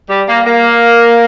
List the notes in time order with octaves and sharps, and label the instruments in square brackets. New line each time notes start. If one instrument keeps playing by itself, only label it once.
[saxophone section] G3
A#3
A#3